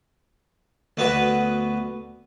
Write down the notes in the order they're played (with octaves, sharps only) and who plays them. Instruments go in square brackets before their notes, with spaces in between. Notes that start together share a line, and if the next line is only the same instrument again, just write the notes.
[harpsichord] D2 B3 F#4 B4